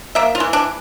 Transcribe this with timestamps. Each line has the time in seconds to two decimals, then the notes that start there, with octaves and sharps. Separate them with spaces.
0.15 A#3 E5
0.35 F4
0.40 E3
0.53 D4